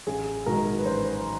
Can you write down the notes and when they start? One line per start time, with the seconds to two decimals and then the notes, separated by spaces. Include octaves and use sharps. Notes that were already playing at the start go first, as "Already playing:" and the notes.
0.07 A1 G#4
0.46 G#2 D#3 F#3 A#4
0.78 B4
0.85 A1 C5